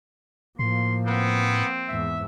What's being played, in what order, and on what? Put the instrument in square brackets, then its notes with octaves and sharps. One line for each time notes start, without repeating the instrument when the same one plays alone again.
[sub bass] A2 [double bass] F3 A#3 [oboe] C6
[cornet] B3 [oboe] C4
[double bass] E2 G#2 [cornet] E5